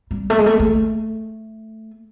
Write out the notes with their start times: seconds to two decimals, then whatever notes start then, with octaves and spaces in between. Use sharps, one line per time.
0.11 G3
0.30 A3
0.39 G#3
0.46 A3
0.60 A3